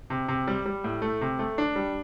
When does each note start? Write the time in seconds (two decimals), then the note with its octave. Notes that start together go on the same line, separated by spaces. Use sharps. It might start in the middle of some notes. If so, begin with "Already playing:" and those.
0.10 C3
0.28 C3
0.48 G3
0.66 G3
0.84 A2
1.02 A3
1.21 C3
1.39 A3
1.58 D4
1.76 G3